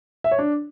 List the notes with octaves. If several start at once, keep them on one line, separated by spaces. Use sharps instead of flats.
E5
C#5
D4